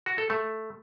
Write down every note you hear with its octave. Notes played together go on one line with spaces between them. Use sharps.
F#4
A4
A3